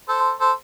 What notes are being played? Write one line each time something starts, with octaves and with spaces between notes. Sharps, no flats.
A4 C5
A4 C5